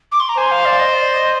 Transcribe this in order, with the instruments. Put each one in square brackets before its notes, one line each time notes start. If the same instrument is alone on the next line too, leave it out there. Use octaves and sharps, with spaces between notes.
[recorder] D6
C6
A#5
[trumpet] C5 [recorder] G#5
[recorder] F5
D5
D#5
D5
D#5